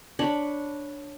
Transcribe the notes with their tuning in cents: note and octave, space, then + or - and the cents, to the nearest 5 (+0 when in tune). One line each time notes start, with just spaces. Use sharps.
D4 +0 C#5 +0 B5 +0